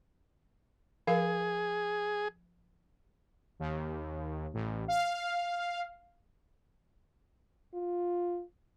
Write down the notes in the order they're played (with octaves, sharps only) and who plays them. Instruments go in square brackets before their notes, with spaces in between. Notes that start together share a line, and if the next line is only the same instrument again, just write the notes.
[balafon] F3 A#4 F5 [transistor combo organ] G#4
[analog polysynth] D#2
A1
F5
[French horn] F4